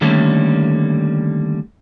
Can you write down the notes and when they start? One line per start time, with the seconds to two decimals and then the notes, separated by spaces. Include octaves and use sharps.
0.01 D3 D#3 G3 A3 A#3 C#4